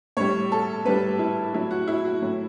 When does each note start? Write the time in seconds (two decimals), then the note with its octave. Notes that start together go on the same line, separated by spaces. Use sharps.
0.17 A2 G3 C#5
0.52 A4
0.85 A2 G3 B4
1.19 E4
1.53 A2 F#3 E4
1.71 F#4
1.88 E4
2.05 F#4
2.22 A2 F#3